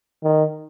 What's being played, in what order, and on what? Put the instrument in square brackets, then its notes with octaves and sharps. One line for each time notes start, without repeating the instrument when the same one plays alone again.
[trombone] D#3